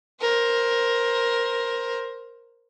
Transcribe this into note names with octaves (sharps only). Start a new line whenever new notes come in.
A#4 C5